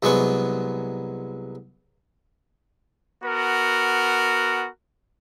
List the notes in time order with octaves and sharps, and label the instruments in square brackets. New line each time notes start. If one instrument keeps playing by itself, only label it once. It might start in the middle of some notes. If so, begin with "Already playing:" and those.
[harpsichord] C2 F#3 G#3 B3 C#6
[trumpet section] B3 F#4 A#4